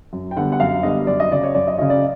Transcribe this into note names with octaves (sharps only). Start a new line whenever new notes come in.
F#2
G5
D3 G3 B3 F#5
F#5
F#2 F5
D3 G3 B3 D#5
F#2 D5
D#5
C#3 F#3 D5
C#5
F#2 D5
D#5
C#3 F#3 D#5
D5